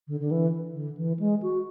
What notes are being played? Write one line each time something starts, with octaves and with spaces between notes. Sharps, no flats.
D3
D3
E3
D3
E3
G#3
F#4